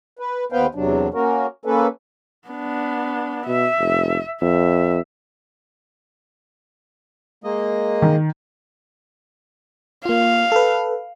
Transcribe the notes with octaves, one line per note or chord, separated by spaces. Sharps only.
B4
D#2 B3 B4 C5 F5 G5
E2 C3 F#3 D4
A#3 C#4 F#4 A#4
A#3 C#4 A4 B4
B3 D4
B2 E5
F1
F2 E5
G#3 A#3 D#5
D#3
A#3 F4 F5
A4 B4